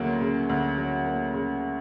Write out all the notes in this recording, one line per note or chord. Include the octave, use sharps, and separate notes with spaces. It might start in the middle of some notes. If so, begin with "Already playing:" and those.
Already playing: D2 C#3 F#3 A#3
C#3
D2
F#3
A#3
C#3